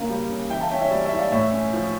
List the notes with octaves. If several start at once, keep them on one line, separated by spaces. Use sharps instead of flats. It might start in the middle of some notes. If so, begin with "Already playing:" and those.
Already playing: C#3 A#3
G3
C#3
E3 E5 G5
F5 A5
C#4 E5 G5
C#5 E5
G3 D5
C#5 E5
E4
D5 F5
A2 C#5 E5
C#4
F3